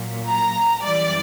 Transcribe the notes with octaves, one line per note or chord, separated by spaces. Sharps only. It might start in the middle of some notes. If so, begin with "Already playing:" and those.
Already playing: A#2 F#3
A#5
F#2 E3 G3 D5